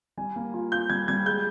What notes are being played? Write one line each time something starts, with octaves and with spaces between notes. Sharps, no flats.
G3 G#5
A#3
F4
F4 G6
G3 G#6
G3 G#6
G#3 G6